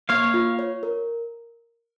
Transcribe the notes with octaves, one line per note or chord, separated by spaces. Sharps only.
A#3 C#5 F5
F4
C#5
A#4